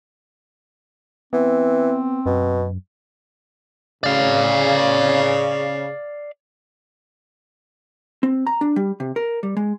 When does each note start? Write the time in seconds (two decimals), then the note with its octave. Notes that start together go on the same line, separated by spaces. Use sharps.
1.33 E3 B3 C4
2.26 F#2 B2
4.04 C#3 D5 F5
8.23 C4
8.47 A#5
8.61 D4
8.76 G3
9.00 C3
9.16 A#4
9.43 G3
9.57 G#3